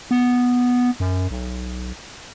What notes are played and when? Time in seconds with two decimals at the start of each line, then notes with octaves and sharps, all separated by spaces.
0.11 B3
1.00 F#2
1.31 B1